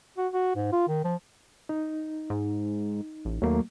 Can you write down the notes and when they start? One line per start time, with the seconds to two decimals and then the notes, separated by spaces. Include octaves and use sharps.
0.17 F#4
0.33 F#4
0.56 G#2
0.72 F4
0.88 D#3
1.04 F3
1.69 D#4
2.30 G#2
3.25 A1
3.42 D#2 F#3 A3 A#3